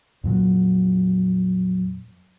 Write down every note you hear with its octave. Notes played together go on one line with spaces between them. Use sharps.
F2 A#2 F#3